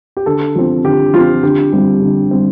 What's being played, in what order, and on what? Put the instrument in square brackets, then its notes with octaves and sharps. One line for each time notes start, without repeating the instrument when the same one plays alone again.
[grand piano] G4
[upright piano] D3 [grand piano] A4
[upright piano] F3 C4
[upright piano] D3 [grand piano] G4
[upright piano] F3 C4 [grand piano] F4
[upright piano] D3 [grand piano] G4
[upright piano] G3 C4
D3
G3 C4